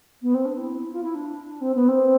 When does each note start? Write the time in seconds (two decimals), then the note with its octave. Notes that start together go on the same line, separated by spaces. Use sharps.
0.22 B3
0.34 C4
0.45 D4
0.57 E4
0.92 F4
1.03 E4
1.14 D4
1.60 C4
1.74 B3
1.88 C4